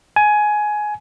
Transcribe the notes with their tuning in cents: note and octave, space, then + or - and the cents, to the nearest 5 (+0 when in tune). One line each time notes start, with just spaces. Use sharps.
G#5 +15